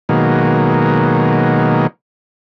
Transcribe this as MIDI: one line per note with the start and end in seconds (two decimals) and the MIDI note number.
0.09 1.87 47
0.09 1.87 51
0.09 1.87 54
0.09 1.87 56
0.09 1.87 58